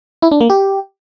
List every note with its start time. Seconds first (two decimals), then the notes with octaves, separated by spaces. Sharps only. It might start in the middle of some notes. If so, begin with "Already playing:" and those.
0.22 E4
0.31 D4
0.41 A#3
0.50 G4